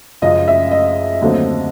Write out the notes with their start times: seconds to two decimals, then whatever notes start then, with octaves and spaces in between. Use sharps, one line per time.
0.22 F#2 C#3 F3 G#3 D#5
0.48 E5
0.71 D#5
1.21 D#2 D3 F#3 A3 C4